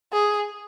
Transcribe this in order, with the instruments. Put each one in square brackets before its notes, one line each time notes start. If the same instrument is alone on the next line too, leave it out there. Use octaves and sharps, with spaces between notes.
[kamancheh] G#4